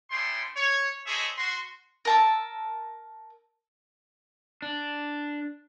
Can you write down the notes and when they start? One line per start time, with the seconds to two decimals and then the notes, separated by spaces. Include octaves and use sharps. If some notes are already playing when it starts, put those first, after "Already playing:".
0.11 A3 B3 C#4 D4 G5 C6
0.56 C#5
1.06 G#4 A4 C5 C#5 D#5 E5
1.38 F#4 C6
2.05 A#4 A5 E6
4.62 D4